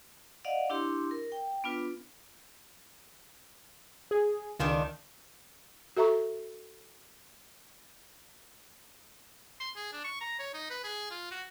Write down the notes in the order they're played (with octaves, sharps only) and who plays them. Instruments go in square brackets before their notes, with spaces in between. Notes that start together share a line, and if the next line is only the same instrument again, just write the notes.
[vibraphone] D5 D#5 F5 F#5
D4 E4 G4 C6
A#4
G5
B3 D4 F4 B4
[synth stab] G#4
[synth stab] C#2 [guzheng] D#3 D4 F4
[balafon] F#4 A4 E5 A#5 C#6
[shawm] C6
G#4
D4
C#6
A#5
C#5
D#4
B4
G#4
F4
F#4